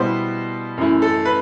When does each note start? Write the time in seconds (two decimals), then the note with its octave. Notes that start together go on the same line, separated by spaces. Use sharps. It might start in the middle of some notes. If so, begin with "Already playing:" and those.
Already playing: B2 G3 B3 E4 C5
0.78 F#2 E3 A3 E4
1.02 A4
1.25 B4